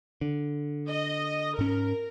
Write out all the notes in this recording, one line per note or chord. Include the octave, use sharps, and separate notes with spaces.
D3
D#5
G#2 C#4 A#4